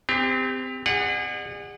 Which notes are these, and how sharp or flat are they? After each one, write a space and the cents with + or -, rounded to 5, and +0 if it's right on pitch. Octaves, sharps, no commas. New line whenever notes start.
C4 -25 G4 +30
G#4 -35 D5 +45 F#5 +0